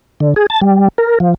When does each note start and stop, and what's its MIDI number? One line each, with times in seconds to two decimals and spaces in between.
0.20 0.34 50
0.36 0.46 68
0.50 0.60 81
0.61 0.88 55
0.98 1.18 70
1.20 1.34 53